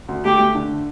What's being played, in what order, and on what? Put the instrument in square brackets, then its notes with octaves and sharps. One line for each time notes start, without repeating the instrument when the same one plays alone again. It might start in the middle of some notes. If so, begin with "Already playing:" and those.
[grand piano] D2
[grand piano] A3 [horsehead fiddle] G4
[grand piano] A3
D3